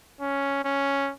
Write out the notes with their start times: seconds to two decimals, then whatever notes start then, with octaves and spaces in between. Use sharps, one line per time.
0.21 C#4
0.65 C#4